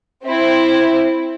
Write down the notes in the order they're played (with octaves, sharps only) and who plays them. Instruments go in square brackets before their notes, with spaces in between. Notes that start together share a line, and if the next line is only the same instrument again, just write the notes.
[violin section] C4 E4